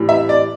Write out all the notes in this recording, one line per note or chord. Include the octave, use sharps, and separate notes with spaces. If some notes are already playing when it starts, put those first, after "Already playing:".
Already playing: A2 E3 G3
E5
D5